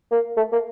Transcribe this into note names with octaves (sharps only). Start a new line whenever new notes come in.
A#3
A3
A#3